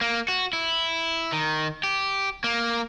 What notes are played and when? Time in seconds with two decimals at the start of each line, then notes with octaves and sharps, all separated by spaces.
0.01 A#3
0.28 F#4
0.53 E4
1.33 D#3
1.83 G4
2.44 A#3